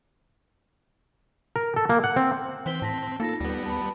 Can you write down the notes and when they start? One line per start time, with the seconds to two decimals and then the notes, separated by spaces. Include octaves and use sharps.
1.56 A#4
1.76 A4
1.89 A#3
2.04 F#5
2.16 C4
2.66 E3 C4 C5 B6 G7
2.82 A2 A5 A#6 B6
3.20 A#3 D#4 F4 A4 A#6
3.40 D#2 G3 B3
3.65 A5 B5